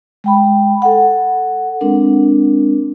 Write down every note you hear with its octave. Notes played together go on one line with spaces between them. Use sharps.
G#3 G5 B5
A4 F#5
G#3 C4 D4 A#4